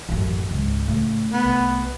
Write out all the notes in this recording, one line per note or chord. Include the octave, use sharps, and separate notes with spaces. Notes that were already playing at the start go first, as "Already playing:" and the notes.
A1 F#2
C#2 G#2
A2 C#3 A3
B3
C2